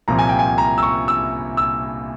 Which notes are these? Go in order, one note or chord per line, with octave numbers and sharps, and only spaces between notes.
C2 A#2 F3 A#5
G#5
G5
G#5
A#5
E6
C#6
E6
E6